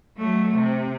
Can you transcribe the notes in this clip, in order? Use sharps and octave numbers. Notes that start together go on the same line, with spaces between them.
F#3 A3
C3